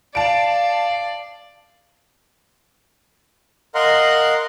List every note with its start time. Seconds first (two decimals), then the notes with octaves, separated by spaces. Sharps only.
0.15 D5 F5 A5 D7
3.75 A#4 D#5 F5 F#5 C6